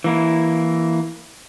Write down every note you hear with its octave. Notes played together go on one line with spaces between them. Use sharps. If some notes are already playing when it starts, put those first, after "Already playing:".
E3 A#3 E4